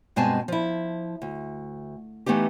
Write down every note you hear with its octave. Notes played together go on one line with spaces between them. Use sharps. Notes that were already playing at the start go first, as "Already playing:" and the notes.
G2 B2 G#3 C4 G#5 A5
F3 E4
D2
E3 A3 B3 D#4 G4